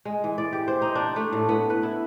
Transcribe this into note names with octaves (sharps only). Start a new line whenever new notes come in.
G#3
E3
D5
G4
C5
D#4
D4
A3
A2
B3
B4
E4